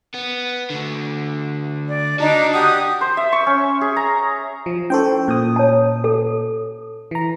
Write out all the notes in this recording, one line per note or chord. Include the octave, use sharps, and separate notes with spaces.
B3
D2 D3
D5
D4 D#4 F#4 A5 A#5
G4 F#5 D#6
C5
E5
C#6
C#4
G#4
A#5
F3
C#4 E4 A4 C5 G5 C#6
A#2 D#6
C#5 A5
A4
E3 A#5